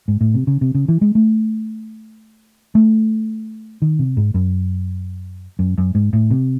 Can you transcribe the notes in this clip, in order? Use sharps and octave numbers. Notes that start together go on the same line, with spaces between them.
G#2
A2
C3
C#3
C3
C#3
E3
G#3
A3
A3
D#3
C3
G#2
F#2
F#2
F#2
G#2
A2
C3